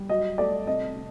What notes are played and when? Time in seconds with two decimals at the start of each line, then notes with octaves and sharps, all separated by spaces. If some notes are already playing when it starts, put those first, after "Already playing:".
Already playing: G3
0.09 F#3 D#5
0.38 A3 D5
0.67 C3 D#5
0.96 C3